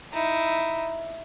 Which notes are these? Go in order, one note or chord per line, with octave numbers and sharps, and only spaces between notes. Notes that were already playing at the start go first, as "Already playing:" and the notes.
D#4 E4